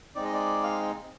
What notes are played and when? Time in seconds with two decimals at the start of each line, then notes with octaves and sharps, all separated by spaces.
0.15 G#3 C4 D#4 D5
0.24 D#5
0.33 D5
0.63 F5